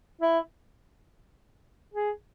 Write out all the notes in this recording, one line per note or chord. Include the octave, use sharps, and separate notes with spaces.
E4
G#4